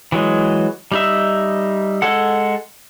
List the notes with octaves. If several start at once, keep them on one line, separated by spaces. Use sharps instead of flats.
E3 F#3 G#3
G3 D#4 E5
G#3 A4 F#5